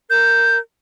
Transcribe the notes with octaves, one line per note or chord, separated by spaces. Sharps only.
A#4 G6